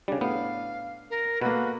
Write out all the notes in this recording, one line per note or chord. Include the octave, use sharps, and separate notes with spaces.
C#3 G3 D4
A2 B3 F5
A#4
B2 A#3 F#4 A4 B4